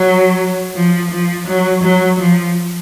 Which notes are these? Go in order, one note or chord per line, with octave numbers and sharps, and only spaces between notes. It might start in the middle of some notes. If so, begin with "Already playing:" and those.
Already playing: F#3
F3
F3
F#3
F#3
F3